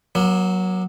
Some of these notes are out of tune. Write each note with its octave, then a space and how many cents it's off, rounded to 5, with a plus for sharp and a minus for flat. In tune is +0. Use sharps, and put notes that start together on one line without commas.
F#3 +0 A#3 +40